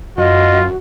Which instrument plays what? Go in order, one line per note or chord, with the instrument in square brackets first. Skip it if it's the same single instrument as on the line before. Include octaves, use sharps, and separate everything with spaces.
[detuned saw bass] F#2 [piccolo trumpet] F4 [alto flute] F#4 [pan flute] D#5